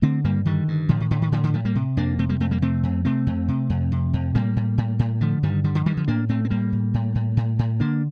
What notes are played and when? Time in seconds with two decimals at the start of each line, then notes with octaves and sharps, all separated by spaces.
0.02 D3 A3 C4
0.24 G2 G3 A#3
0.45 D3 D#3 G3
0.68 G2
0.89 A2 D3 F3
1.00 D#3
1.11 A2 D3
1.22 D#3
1.32 A2 D3 F3
1.44 D3 F3
1.54 A2 F3 A3
1.65 G3 A#3
1.75 C3
1.97 F2 A#3 D4
2.19 C3 A3 C4
2.29 G3 A#3
2.40 F2 A3 C4
2.51 G3 A#3
2.62 C3 A3 C4
2.83 F2
3.05 C3 A3 C4
3.27 F2
3.48 C3
3.70 F2
3.92 C3
4.13 F2
4.35 A2 G3 A#3
4.56 A2
4.78 A2
4.99 A2
5.21 D3 F3 A3
5.43 G2 D#3 G3
5.64 D3 D#3 G3
5.75 D3 F3
5.86 G2 D#3 G3
5.97 D3 F3
6.08 A2 A#3 D4
6.29 A2 A3 C4
6.45 C4
6.50 A2 G3 A#3
6.72 A2
6.94 A2
7.15 A2
7.37 A2
7.59 A2
7.80 D3 A#3 D4